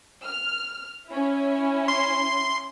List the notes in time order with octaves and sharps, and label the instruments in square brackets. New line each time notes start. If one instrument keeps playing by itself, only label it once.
[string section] F6
C#4 E4
[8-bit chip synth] C6